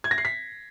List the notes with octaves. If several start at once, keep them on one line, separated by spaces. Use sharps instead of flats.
G#6
A#6
C7
B6